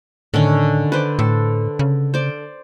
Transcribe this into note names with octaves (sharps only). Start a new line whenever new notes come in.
A2 D3 D#3 C#4
B4 C5 D5
A2 A4
C#3
C5 D5